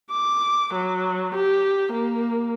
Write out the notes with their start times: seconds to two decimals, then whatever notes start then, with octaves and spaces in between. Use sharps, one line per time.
0.11 D6
0.75 F#3
1.35 G4
1.93 A#3